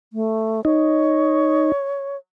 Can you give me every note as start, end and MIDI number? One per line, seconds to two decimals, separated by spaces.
0.13 0.64 57
0.65 1.72 63
0.65 2.16 73